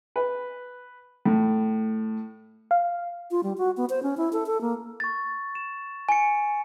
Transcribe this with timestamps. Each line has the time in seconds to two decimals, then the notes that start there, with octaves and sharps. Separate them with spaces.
0.16 B4
1.25 A2
2.71 F5
3.31 F4
3.43 G3
3.58 F#4
3.77 B3
3.90 C5
4.03 C#4
4.17 E4
4.33 A4
4.46 A4
4.61 A#3
5.00 C#6 A6
5.55 E7
6.09 G#5 C#7